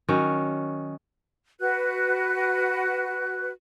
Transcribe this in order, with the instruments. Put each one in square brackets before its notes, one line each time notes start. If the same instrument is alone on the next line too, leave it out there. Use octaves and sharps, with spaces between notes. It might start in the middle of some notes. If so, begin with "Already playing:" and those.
[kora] D#3 F#3 C#4
[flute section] F#4 B4 F#6